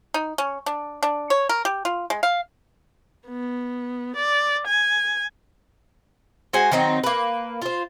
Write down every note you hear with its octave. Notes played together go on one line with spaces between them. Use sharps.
D#4
C#4
D4
D4
C#5
A#4
G4
F4
G#3
F5
B3
D5
G#5
G#3 F#4 C5 G#5
D#3 F#3 C4 D#4
A#3 B4
F4 C5